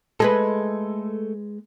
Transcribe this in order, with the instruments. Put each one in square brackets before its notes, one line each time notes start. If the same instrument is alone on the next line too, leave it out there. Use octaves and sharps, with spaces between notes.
[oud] G#3 G#4 B4 [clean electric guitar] A3 A4